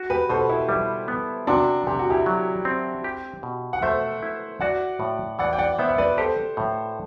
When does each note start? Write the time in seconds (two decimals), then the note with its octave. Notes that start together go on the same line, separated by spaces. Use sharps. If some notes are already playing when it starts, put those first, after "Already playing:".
Already playing: F#4
0.10 G4 B4
0.29 B2 A4 C5
0.49 E4
0.69 G3 E4
1.08 B3
1.47 C3 D4 F#4
1.87 C3 G4
1.99 F#4
2.10 E4 G4
2.26 F#3
2.65 C4
3.04 G4
3.43 B2
3.73 F#5
3.82 A3 C5 E5
4.22 E4
4.61 F#4 D5 F#5
5.00 A2
5.39 E3 D5 F#5
5.53 G5
5.58 D5 F#5
5.78 B3 C5 E5
5.89 E5
5.98 B4 D5
6.17 G4 A4 C5
6.57 A2